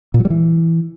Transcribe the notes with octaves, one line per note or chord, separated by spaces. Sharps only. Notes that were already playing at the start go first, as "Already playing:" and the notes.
A#2
F#3
G3
E3